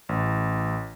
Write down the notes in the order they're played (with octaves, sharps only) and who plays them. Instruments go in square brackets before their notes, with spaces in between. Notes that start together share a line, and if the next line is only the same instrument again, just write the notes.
[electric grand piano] A1